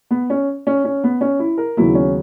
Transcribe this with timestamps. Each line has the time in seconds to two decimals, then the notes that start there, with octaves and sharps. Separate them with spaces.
0.11 B3
0.30 C#4
0.67 C#4
0.84 C#4
1.04 B3
1.21 C#4
1.39 E4
1.58 A#4
1.77 D#2 C#3 F#3 B3 E4
1.95 C#4